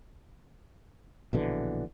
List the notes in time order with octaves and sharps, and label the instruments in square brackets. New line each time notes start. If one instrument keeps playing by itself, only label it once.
[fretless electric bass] A#1 B2 D3 E3